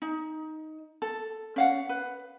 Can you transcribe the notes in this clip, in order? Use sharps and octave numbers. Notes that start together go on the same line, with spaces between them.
D#4
A4
C#4 F5 F#5
B4